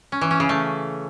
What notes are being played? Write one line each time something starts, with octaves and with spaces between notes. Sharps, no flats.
C#4
E3
C#4
C#3
A3